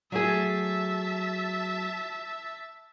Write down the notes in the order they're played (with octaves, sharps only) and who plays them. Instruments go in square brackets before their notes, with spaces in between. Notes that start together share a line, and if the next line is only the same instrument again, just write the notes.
[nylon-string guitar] F#3 A3 G#4 [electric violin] E5 A5